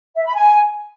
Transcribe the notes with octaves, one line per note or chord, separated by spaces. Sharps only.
E5
B5
G#5